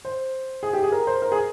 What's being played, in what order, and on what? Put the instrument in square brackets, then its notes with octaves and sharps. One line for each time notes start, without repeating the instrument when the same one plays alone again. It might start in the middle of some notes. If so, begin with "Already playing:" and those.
[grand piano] C5
G#4
G4
G#4
A#4
C5
A#4
G#4